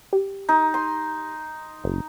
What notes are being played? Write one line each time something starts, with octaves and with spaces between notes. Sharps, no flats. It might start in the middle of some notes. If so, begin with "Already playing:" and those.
G4
D#4
C6
F#1